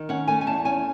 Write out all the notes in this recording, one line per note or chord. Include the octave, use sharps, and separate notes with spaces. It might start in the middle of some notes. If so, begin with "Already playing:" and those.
Already playing: D#3
C#4 F#5
A3 G#5
G#5
E2 A5
C#4 G#5